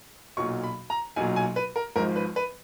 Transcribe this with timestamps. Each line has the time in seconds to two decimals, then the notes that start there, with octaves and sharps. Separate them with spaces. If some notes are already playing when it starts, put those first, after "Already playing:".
0.37 B1 A#2 F#3 C#6
0.63 B5
0.90 A#5
1.16 B1 A#2 F#3 G#5
1.36 G#5
1.56 B4
1.76 A#4
1.96 G#1 G#2 F3 A#4
2.16 B4
2.36 B4